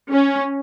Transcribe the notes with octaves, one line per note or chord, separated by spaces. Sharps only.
C#4